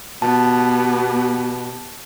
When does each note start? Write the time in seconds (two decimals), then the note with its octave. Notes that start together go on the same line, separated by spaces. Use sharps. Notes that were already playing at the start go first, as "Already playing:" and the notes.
0.22 B2 B3 G4 A5